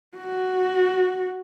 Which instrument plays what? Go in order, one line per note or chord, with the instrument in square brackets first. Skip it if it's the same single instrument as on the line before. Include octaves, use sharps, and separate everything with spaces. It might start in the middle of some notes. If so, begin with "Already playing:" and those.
[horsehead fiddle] F#4